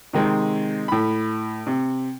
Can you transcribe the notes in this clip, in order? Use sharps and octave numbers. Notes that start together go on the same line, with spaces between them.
C3 D#3 G#3 C4
A2 B5
C3